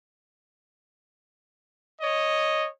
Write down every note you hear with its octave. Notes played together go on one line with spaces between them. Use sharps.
C#5 D#5